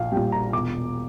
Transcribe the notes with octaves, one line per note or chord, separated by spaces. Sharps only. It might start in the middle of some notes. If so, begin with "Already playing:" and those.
Already playing: A#1 F5
A#2 G3 G5
A#5
E1 D6